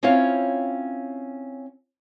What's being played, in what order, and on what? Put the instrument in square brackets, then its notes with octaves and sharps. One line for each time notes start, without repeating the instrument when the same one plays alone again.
[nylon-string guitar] C4 C#4 E4 F4 C#5 F5